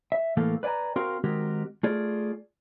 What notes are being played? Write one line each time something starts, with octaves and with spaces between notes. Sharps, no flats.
E5
A2 E3 A3 A#3 A4 F5
B4 D5 E5 G#5 A#5
C4 F#4 A#4 F5 C6
D#3 G#3 C4 F#4 G4 A#4
A3 F4 G#4 D5